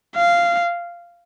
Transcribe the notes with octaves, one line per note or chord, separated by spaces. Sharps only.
F5